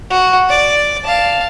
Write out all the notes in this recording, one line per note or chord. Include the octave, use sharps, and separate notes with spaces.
F#4
D5
F5 A5